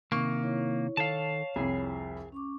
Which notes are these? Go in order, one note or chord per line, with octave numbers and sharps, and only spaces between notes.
C3 D#3 A#3 C#6
E4 C#5
D#3 A4 C#5 F5 A5
C2 F2 E4 G#4
C#4 C#6 D6